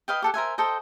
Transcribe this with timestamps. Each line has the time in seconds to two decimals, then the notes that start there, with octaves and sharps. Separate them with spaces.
0.08 B4 D#5 F5 G5
0.22 G4 A4 F#5
0.34 A#4 C5 E5 G#5
0.58 A4 C5 D#5 G5